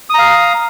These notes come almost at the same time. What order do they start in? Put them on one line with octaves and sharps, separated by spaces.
D#6 A#5 F5